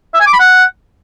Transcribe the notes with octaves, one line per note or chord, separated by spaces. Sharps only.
E5
G#5
D6
B5
F#5